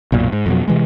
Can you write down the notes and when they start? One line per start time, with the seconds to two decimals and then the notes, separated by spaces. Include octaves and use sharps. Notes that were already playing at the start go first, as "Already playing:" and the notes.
0.12 B1 F#2 A#2
0.33 G#2
0.46 F2 B2 F#3
0.68 C3 E3 G#3